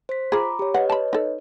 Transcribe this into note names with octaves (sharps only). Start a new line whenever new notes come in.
C5 B6
F4 G#4 A#5 B5 D6
G4 C#5
B4 C#5 D#5 F#5
A5 B5
D#4 A4